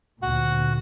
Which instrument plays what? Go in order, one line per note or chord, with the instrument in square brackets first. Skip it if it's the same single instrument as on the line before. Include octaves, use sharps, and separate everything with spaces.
[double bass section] D2 A#2 [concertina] F#4 F#5